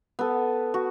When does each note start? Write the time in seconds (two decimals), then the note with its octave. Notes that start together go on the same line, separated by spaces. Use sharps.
0.19 B3 A4
0.74 F#4